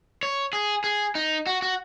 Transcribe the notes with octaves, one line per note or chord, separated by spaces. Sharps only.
C#5
G#4
G#4
D#4
F#4
F#4